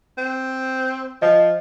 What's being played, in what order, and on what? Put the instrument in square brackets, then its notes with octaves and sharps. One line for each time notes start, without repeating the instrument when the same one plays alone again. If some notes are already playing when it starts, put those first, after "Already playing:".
[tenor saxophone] C4
[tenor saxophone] F3 [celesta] D#5